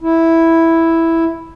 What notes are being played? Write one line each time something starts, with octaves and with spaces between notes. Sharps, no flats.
E4